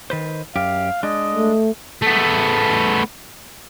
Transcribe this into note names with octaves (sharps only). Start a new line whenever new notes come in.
D#3 B4 C5
F#2 G4 F5
G#3 D4 D#5
A3
A3 B3